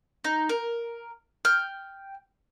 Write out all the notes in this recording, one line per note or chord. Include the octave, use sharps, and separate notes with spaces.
D#4
A#4
G5 F6